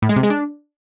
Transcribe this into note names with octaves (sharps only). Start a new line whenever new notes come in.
A2
G#3
C3
G#3
D4